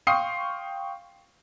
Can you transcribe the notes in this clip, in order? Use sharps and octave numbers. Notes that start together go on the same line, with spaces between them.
F5 G5 C6 C#6 D#6 C7